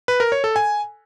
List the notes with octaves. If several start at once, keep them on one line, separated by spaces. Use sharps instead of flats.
B4
A#4
C#5
A4
G#5